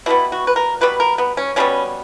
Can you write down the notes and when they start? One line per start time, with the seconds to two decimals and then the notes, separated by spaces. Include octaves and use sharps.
0.06 B2 G3 B3 E4
0.32 F#4
0.47 B4
0.56 A#4
0.81 B2 G3 B3 B4
1.00 A#4
1.18 B3
1.37 C#4
1.56 B2 G3 B3 C#4